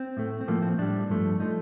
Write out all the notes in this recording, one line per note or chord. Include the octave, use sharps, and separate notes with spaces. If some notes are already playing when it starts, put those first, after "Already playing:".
Already playing: C4
A2 A3
C4
A2 F3 A3 A#3
C4
A2 G3 D4
G2 F3 A3
F3 A3 D#4